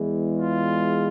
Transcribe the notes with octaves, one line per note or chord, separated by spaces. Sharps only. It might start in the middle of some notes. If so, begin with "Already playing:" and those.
Already playing: E2 E3 G#3
F4